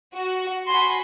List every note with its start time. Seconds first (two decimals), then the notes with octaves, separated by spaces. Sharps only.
0.15 F#4
0.68 F#4 G#5 B5 C6